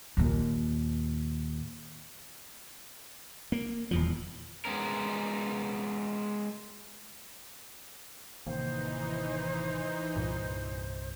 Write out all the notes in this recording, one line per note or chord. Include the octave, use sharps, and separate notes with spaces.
D#2 A#2
A#3
D#1 E2 F3
G#3 B3 C#4 A#4
A1 C3 D#3 E3 A#3 D#4 C5
C2 G2 A#2